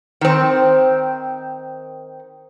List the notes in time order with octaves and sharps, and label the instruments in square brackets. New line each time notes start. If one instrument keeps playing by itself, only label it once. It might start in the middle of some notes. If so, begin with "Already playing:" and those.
[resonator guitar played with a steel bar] D#3 C4